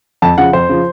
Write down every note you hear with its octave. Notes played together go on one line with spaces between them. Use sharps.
F2 A5
C#3 F3 F#5
F2 C5
C#3 F3